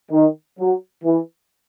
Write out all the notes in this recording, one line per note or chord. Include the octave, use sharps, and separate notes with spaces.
D#3
F#3
E3